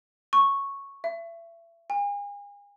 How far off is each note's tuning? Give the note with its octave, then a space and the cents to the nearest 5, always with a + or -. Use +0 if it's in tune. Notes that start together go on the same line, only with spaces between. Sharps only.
C#6 -5
E5 +30
G#5 -40